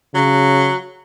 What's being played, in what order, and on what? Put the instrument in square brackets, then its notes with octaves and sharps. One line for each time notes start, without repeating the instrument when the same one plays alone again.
[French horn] C#3 [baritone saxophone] F#3